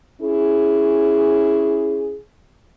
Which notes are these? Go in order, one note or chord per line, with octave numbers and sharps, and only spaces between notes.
C#4 E4 G#4